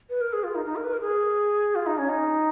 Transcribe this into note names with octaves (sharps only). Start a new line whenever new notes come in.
B4
A#4
G#4
F4
D#4
D#4
A#4
B4
A#4
G#4
F4
D#4
C#4
D#4